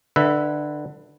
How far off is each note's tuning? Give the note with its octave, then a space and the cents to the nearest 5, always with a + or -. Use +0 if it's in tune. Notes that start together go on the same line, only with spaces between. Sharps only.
D3 +25 B4 +0 E5 +0